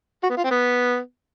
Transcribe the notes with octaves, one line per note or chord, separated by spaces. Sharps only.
F#4
B3
F4
C4
B3